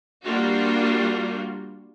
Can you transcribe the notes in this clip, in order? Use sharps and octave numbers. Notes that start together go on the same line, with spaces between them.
G3 A#3 D4 F4 F#4